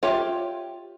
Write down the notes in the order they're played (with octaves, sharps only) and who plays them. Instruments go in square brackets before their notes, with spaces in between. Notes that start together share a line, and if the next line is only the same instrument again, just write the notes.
[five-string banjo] F4 G4 C#5 E5